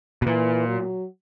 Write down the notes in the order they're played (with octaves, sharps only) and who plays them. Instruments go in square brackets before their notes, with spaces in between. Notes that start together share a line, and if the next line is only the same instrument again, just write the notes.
[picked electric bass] B2
[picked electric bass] A#2 [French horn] E3
[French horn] F#3